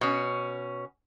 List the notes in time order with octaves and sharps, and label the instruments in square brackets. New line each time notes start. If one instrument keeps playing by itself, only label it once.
[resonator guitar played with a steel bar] B2 C#4